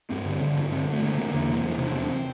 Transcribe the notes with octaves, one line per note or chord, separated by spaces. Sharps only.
G2 C4
D3
D3
G2
D3 C4
D3 A3
D3 A#3
D3 A#3
E2
C3
E2
C3
D4
E2 C4